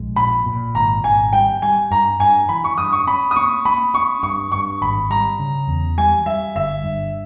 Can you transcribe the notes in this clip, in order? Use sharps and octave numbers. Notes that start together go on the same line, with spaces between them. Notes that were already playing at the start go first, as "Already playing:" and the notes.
Already playing: A#1 G#3
A#2 B5
A#2
G#1 A#5
G#1 G#5
G3 G5
G3 G#5
G2 A#5
G2 G#5
E3 B5
C#6
G2 D#6
C#6
C#4 B5
D#6
A#3 C#6
A#3 B5
C#4 C#6
G2 C#6
G2 C#6
G#1 B5
G3 A#5
C#3
E2
G3 G#5
G3 E5
G1 E5
G2